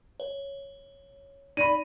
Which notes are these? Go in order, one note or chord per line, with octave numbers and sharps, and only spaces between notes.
C#5
D#4 D5 B5 D#7